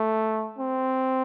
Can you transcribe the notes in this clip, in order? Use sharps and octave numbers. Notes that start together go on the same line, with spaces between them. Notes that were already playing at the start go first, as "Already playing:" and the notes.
Already playing: A3
C4